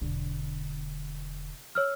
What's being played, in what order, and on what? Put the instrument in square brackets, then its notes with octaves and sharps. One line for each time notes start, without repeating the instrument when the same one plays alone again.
[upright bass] E1 D3
[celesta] C#5 E6 F6